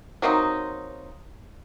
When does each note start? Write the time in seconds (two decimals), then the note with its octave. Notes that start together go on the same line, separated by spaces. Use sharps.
0.22 F#3 A#3 C4 D#4